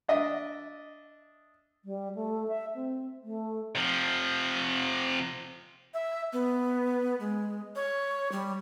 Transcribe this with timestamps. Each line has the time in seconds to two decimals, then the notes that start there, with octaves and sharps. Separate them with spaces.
0.08 D4 D#5 E5
1.85 G3
2.15 A3
2.48 E5
2.75 C4
3.23 A3
3.75 C3 F3
5.94 E5
6.33 B3
7.20 G#3
7.76 C#5
8.32 G3